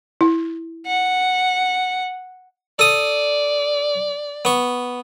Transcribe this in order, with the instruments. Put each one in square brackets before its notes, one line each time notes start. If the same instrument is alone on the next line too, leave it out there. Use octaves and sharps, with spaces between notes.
[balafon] E4
[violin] F#5
[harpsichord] A4 D#6 [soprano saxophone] D5
[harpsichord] B3 C#6